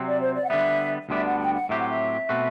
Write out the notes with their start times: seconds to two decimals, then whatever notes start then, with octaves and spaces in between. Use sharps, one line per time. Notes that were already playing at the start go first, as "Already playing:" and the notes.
Already playing: C3 F#3 C4
0.08 D5
0.20 C5
0.34 D5
0.44 F#5
0.49 D3 G3 B3 E5
1.09 D2 D3 G3 B3 D4 E5
1.25 F#5
1.39 G5
1.54 F#5
1.69 A2 F#3 C4 G4 E5
1.79 F#5
1.90 E5
2.29 B2 A3 C4 F#4 B4